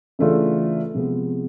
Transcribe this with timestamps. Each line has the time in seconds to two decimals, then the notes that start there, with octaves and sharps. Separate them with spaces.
0.19 C#3 E3 A3 D4 F4
0.94 C3 F3 G#3 B3